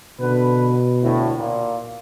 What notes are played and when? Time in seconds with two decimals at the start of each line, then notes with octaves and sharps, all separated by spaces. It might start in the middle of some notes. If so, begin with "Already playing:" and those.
0.21 B2 D3 B4
1.04 D2 A2
1.37 A#2